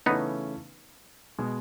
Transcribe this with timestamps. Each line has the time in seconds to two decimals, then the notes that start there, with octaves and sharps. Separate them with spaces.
0.06 C#3 E3 A3 B3 C#4 D#4
1.38 B2 G#3